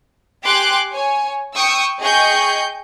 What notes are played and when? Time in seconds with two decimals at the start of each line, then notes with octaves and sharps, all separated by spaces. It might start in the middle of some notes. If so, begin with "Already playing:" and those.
0.44 G4 G5 G#5 C6 D6 F#6
0.92 C#5 G#5
1.52 G5 C#6 D#6 E6
2.00 G#4 D#5 G5 C#6 G6